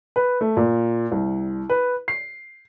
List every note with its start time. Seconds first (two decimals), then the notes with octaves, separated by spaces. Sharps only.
0.16 B4
0.41 A3
0.57 A#2
1.12 C2
1.70 B4
2.08 C7